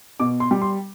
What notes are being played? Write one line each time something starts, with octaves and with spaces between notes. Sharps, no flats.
B2 D6
C6
G3
C6